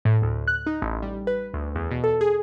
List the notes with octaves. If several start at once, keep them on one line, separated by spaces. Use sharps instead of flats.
A2
D2
F#6
D#4
A1
G3
B4
D2
E2
B2
A4
G#4